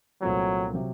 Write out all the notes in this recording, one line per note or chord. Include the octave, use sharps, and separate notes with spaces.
C2 A#2 F#3 A3 C4 F4
C3 F#3